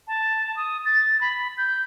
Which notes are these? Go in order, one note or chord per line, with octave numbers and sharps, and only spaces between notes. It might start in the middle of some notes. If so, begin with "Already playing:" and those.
A5
D#6
A6
B5
G6